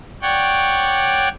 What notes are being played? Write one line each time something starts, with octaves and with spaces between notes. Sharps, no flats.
C#5 D5 F#5 G5